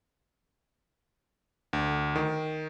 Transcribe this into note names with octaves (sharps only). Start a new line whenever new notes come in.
D2
D#3